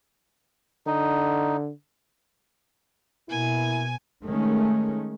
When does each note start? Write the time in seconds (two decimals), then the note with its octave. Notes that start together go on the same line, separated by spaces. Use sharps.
0.87 D3 D#4
3.29 B2 A#3 B3 E4 G#5
4.24 D#3 G#3 A3 C#4